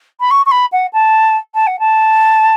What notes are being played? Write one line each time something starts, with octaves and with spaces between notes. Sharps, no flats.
B5
C#6
C#6
B5
F#5
A5
A5
F#5
A5